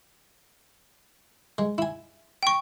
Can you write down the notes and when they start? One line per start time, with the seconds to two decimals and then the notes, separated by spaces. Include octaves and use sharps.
1.58 G#3
1.78 E4 G#5
2.43 G5 C#6